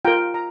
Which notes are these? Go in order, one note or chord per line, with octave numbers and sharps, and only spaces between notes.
F4 A#4 G5 A#5
A#5